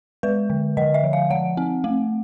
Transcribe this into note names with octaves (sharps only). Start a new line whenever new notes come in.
G#3 B4
D3
D3 D#5
E5
F3
F5
F3 F#5
C4
A3